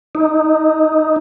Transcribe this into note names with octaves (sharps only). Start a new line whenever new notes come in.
D#4